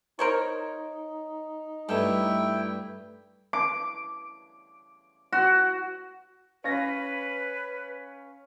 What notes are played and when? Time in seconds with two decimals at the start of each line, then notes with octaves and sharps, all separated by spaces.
0.19 D#4 A#4 C5 C#5
1.89 G2 A3 E4 A4 G5
3.53 D6
5.32 F#4
6.64 C#4 B4 F5 A#6